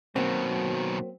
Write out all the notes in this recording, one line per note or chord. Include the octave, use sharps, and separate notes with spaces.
B2 D#3 F#3 A#3 C4